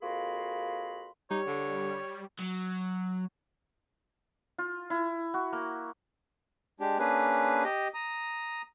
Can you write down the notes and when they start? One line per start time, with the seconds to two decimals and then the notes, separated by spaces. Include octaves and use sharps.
0.02 F2 A#3 F#4 G#4 B5 C6
1.31 G3 D#4 G4 C#5
1.47 D3
2.40 F#3
4.58 F4
4.90 E4
5.34 F#4
5.53 A#3
6.80 G#3 D4 G4
6.99 A#3 C#4 D4 G#4 B4
7.64 G4 D#5
7.94 A#5 D#6